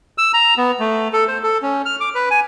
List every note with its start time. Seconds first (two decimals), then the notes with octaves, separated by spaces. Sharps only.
0.18 E6
0.34 A#5
0.57 B3
0.80 A3
1.13 A4
1.28 C5
1.43 A4
1.62 C#4
1.85 F6
2.00 D6
2.15 B4
2.31 G#5